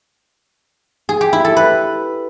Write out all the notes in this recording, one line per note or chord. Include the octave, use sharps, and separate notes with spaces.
G#4
G4
E4
A4
B4